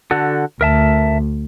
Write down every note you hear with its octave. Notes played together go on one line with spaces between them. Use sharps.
D3 F#4 A4
D2 A#4 E5 A5